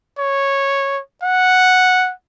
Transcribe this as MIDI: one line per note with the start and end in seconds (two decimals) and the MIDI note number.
0.19 1.00 73
1.23 2.12 78